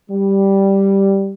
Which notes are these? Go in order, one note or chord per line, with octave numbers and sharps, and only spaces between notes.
G3